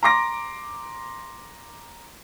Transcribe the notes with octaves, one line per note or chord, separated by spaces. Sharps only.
A#5 C6 D6 A#6